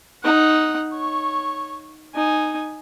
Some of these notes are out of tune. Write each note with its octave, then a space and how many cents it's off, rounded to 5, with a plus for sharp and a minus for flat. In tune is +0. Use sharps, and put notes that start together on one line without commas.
D#4 +0 F#5 +0
C#5 +0 C#6 -15
D#4 -10 G#5 +0